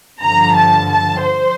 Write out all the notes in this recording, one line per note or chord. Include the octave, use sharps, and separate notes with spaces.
G2 D3 F3 A#5
A5
A5
C5